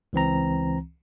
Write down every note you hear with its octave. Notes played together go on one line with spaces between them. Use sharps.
C#2 E3 C4 A#5